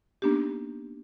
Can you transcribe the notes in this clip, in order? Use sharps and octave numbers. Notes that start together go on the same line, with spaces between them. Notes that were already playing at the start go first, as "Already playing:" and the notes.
A#3 B3 D4 D#4 G4